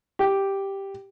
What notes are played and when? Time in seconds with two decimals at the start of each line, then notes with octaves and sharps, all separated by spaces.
0.19 G4